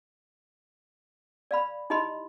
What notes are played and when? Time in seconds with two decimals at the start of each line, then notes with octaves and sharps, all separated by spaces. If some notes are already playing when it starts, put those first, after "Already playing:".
1.51 D5 F5 B5
1.90 D#4 E4 G4 D#5 B5 C6